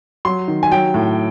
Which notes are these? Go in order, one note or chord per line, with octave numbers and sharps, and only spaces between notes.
F#3 C6
D#3
G#5
F#3 G5
A2